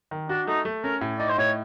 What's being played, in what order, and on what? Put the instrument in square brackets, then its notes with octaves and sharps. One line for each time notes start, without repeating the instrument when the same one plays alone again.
[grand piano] D#3
[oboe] D4 [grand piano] F#4
[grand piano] A3 [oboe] D#4
[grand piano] A3
[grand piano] C#4 [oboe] A#4
[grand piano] A2
[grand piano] D#4 [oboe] D5
[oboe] C5
[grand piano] A2 [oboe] C#5